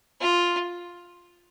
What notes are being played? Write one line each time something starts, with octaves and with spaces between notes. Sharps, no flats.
F4